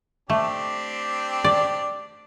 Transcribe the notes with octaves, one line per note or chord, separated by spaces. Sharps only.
A3 C4 D4 G4
D5